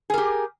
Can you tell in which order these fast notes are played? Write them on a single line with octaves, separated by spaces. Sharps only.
G#4 A#4 G4